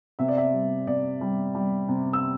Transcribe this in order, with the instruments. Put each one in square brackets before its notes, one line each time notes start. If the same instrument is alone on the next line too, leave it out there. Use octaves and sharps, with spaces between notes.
[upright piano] C3 E5
D5
E5
G3
C3 D5
G3
G3
C3
E6